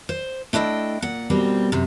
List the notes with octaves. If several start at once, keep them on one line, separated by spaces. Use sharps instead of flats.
C5
A3 D4 E4 D#5 G5
A#2 F#5
B2 G3 A#3 C4
F#2 C3